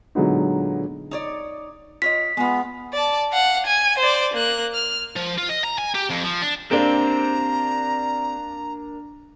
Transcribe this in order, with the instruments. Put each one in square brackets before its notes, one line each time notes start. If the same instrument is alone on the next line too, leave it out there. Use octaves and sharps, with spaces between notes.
[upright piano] A#2 D3 F#3 G#3 B3 D#4
[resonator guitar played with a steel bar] D#4 C#5 D5
[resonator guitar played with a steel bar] F4 C#5 D#5 [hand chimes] B6
[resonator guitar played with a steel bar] G#3 F4 [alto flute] B3
[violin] D5 A5
F5 F#5
G#5
C5 D5
A#3 F#6
F6
[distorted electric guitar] F3
F4
D#5
A#5
G#5
G4
F2
F3
D4
[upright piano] A#3 D4 [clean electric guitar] C4 G4 C5 [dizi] A#5